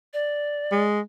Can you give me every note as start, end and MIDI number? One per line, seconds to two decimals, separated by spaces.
0.13 0.82 74
0.71 1.00 56